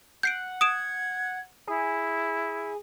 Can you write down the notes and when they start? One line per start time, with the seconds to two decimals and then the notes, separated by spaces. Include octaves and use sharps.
0.23 F#5 G6 C7 D7
0.61 D#6 G#6 D7 E7
1.67 E4 G#4